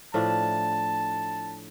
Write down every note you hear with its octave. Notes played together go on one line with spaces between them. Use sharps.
A2 F3 A3 D4 A5